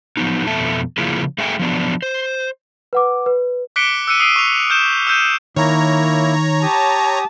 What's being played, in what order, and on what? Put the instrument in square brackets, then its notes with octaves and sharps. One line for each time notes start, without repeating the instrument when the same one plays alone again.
[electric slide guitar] F3 F#3 B3 D#4
F2 B2 A4 E5 A5
C#3 F3 A#3 E4 F4 G#4
A3 G#4 E5 G5 G#5
F3 F#3 B3 D4
C5
[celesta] B4 F#5 D6
B4
[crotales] D6 F#6 B6 C#7 D7 G7
E6 F#6 C#7 D#7
D#6 C7 D7 D#7
C#6 F7
F6 G6 E7
E6 F6 G6 D#7
[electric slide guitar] D#3 [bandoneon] A#3 E4 [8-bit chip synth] C#5 A#5
[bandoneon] G4 D#6 [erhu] A5